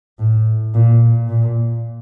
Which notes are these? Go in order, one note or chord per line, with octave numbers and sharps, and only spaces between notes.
A2
A#2
A#2